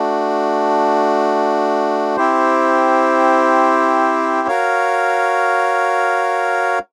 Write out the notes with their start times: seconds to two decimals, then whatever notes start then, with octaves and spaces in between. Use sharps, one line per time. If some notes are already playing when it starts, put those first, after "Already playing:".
Already playing: A3 D4 F#4
2.16 C4 E4 G4 C5
4.48 F#4 A#4 C#5 F5